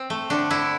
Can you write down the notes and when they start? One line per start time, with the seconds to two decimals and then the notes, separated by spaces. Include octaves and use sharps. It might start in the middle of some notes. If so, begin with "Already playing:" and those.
Already playing: C4
0.10 A3
0.30 D3 D4
0.50 D3 E4